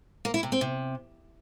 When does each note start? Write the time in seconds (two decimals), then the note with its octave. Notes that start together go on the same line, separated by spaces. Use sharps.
0.25 A#3
0.34 E4
0.43 C3
0.52 C4
0.61 C3